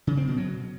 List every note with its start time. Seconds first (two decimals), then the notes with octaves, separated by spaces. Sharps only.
0.07 C#3
0.17 C4
0.27 B2
0.38 F#3